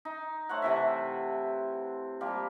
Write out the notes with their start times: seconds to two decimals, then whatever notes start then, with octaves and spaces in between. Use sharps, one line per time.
0.05 D#4
0.49 A3 C5 C#5 F#5
0.62 C3 E3 E5
2.21 F3 G3 A#3